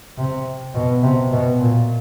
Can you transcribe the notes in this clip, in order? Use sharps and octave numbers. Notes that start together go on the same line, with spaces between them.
C3
B2
C3
B2
A#2